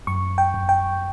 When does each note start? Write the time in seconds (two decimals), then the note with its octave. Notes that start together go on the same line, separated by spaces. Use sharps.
0.07 F#2 C#6
0.38 G5
0.54 F#2
0.69 G5